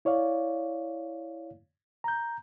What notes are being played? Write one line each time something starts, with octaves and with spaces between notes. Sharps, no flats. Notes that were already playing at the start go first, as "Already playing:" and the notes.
E4 C#5 D5 F5
A#5 G6